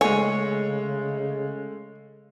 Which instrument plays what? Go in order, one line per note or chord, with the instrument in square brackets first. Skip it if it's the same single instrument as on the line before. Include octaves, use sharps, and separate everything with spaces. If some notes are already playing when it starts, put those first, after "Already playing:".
[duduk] C#3 [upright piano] G#3 A3 [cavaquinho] C#5 [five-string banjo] G#5